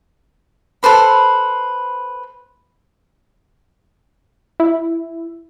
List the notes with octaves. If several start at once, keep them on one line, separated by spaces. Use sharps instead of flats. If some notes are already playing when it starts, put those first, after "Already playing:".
A4 B4 C5 B5
E4